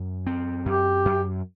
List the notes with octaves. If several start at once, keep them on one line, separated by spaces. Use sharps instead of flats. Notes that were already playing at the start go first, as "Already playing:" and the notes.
Already playing: F#2
C4
F#2 G4
F#2